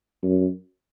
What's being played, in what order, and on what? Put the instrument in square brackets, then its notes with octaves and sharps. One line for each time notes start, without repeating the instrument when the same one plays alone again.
[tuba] F#2